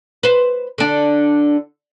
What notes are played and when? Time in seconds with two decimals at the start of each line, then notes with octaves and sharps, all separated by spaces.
0.23 B4 C5
0.78 D3 D4